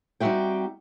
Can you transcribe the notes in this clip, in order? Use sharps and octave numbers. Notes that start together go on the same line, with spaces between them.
G3 C4 D#4 F#4 E5 G5